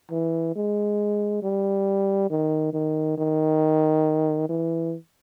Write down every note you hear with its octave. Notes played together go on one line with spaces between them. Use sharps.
E3
G#3
G3
D#3
D#3
D#3
E3